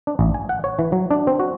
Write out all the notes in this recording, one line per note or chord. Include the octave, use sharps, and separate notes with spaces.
D4
A1
G#5
F#5
C#5
E3
F#3
D4
C4
F#4